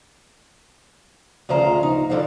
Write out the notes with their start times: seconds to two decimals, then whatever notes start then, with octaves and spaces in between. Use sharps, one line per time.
1.49 D2 C#3 F3 C5 A#5
1.83 D#4
2.10 G2 D3 F3 C5 F5